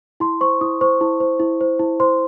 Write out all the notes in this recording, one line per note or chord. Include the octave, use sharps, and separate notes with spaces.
E4 C6
C5 C#6
E4 D#6
C5 C#6
E4
C5
E4
C5
E4
C5 C6